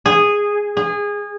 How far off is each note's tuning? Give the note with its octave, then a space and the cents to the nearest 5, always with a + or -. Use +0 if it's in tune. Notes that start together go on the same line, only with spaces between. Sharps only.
G#4 -10
G#4 -25